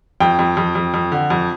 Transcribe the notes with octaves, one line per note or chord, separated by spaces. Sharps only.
F2 G5
F2
F2
F2
F2
D3
F2